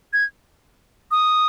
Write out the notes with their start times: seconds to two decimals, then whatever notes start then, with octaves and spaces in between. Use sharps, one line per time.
0.13 G#6
1.11 D#6